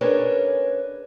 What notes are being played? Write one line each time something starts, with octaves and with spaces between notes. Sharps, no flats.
C#4 D4 G#4 A#4 B4 C#5